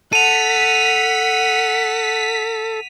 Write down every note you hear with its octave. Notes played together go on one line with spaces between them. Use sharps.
A4 F#5 B6 D#7 F7